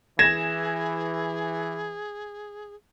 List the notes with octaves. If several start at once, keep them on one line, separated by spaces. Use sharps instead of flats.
E3 G#4 G#6 A#6 E7